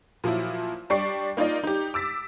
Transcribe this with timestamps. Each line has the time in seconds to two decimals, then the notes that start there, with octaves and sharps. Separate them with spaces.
0.24 A#2 F3 F#3 E4
0.90 G3 D4 D5 G5 C#6 C7
1.37 A#3 D#4 F4 D5 D#5
1.64 D#4 G4
1.94 D6 E6 A6 B6